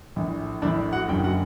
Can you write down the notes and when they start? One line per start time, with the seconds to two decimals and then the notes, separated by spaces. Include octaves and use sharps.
0.16 A#1 A2
0.62 A#1 A2 D4 D5
0.93 F#4 F#5
1.08 F#1 F#2 D3 G4 G5
1.24 F#4 F#5